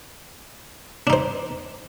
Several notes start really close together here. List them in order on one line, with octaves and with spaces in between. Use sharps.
D4 D#4 C5